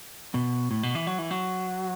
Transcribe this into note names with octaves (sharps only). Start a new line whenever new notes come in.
B2
A2
B2
E3
F#3
E3
F#3